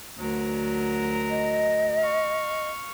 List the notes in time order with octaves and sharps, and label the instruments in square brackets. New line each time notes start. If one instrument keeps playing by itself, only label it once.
[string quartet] D2 F#3 A#4
[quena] D#5
[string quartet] F5 C#6